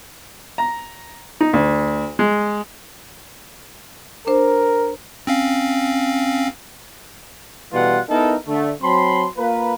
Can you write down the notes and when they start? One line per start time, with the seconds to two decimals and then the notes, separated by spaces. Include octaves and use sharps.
0.58 A#5
1.41 D#4
1.53 D2
2.19 G#3
4.27 D4 A#4 C5
5.27 C4 C#4 F5
7.72 B2 E3 G3 A3 F4 F#5
8.09 B3 D#4 E4 A4 A#4
8.46 D3 A3
8.82 F#3 C4 A5 B5 C6
9.36 A#3 F4 A#4 B4